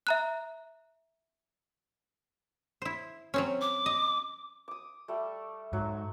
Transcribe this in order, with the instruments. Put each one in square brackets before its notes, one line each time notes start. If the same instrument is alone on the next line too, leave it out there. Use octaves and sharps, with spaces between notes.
[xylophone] E5 A#5 F#6
[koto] E4 C5
F#3 C4 C#4
[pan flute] D6
[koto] D#5
[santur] D6 D#6
G3 A3
[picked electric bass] G#2 [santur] F#3